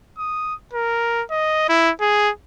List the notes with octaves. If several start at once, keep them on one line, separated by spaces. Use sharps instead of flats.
D#6
A#4
D#5
E4
G#4